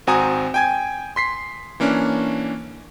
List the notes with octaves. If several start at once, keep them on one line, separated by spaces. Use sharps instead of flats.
G#1 C4 F#4 G#5 A#5 D#6
G5 G#5 G#6
C6 B6 C7
E3 A#3 C#4 D4